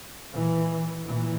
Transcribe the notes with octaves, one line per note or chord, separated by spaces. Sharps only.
A#2 E3
A#2 E3